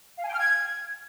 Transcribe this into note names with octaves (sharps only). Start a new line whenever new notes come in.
F5
G#5
G5
F6
G#6